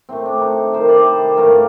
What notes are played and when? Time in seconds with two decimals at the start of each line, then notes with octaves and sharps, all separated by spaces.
0.09 A2 A3 C4
0.25 D4
0.41 D#4
0.73 C3 D#3 G3 C5
0.89 D5
1.05 C5
1.37 G2 D3 F3 A3 A#4